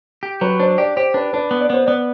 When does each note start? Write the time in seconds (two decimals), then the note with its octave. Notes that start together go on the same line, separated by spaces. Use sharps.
0.23 G4
0.41 F#3 B4
0.60 D4 C5
0.78 G4 D5
0.96 G4 C5
1.14 D4 B4
1.33 D4 B4
1.51 B3
1.61 D5
1.70 B3 C5
1.86 B3 D5